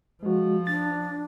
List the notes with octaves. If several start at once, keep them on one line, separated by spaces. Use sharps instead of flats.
F3 G#3 F#4
D4 A6